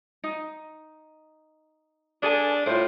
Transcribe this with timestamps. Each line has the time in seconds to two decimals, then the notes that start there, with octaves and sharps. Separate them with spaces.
0.24 D#4
2.22 D4 G#4 A4 G#5
2.66 A2 F4 C5